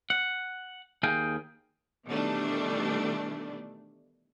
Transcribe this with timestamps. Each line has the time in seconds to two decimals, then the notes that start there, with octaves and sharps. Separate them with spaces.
0.10 F#5
1.03 D#2 G#4 F5 G5
2.06 B2 D#3 E3 G3 A3 D4